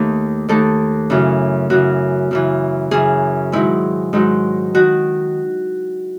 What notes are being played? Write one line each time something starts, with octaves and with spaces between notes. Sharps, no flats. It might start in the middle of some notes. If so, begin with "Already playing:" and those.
Already playing: D#2 D#3 A3 D#4
D#2 D#3 A3 D#4 A4
F#2 C#3 E3
F#2 C#3 E3 F#4
F#2 C#3 E3
F#2 C#3 E3 G#4
G#2 D#3 F#3 E4
G#2 D#3 F#3
D#3 F#4